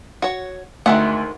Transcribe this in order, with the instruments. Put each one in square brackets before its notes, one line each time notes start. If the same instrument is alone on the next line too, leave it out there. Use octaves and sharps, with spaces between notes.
[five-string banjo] F#4 C#5
[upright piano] D2 E5 [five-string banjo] D#3 G#3 F#5